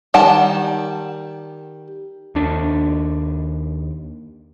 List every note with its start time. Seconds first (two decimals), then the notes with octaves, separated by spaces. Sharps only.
0.14 D#3 G3 F#5 A5
2.35 D#2 D4